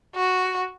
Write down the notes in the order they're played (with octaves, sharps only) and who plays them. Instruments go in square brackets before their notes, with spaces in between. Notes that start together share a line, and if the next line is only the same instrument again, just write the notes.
[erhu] F#4